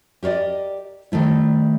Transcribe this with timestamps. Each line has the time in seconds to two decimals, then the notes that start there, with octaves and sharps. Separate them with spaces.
0.23 G4 A#4 C5 D5 D#5
1.12 D#3 G3 A3 E4